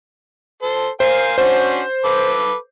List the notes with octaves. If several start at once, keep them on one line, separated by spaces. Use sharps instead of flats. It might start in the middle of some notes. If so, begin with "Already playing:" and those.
A4 C5
A#4 C5 F5 G#5
C#4 D4 F#4 C5
A4 B4 D6